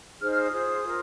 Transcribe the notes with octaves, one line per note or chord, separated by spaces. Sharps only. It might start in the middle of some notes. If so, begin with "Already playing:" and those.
D#4 G#4 C5 F6
F6
D#6
F4 G#4 C5
F4 A#4